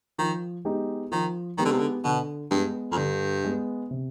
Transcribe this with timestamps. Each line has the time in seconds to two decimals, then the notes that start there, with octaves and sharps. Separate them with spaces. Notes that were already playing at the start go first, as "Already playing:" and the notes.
0.19 D#3 F3
0.65 G#3 B3 D#4 G4
1.12 D#3 F3
1.58 D#3 G#3 B3 D#4 G4
1.65 D3
1.72 C3
1.79 D3
2.04 B2 D3
2.51 G2 G#3 B3
2.92 F2
2.97 G2 D3
3.44 G#3 B3
3.91 C3